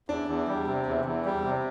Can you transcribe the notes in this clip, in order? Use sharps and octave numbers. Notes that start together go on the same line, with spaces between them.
E2 D4
E2
G3
C3
E2
E2
G3
C3